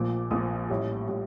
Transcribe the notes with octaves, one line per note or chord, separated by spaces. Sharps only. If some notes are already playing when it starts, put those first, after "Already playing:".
Already playing: A#1 A#2 F3 D6
A#1 A#2 F3 D#6
A1 A2 G3
A2 G3